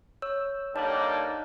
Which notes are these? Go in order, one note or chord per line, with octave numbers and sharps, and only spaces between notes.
C#5 E6
D3 G3 A#3 D#4 C#5 A5 F#6